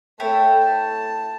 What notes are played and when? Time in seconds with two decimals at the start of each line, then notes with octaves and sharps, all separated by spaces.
0.20 A3 E4 A4 C#5 G5
0.63 A5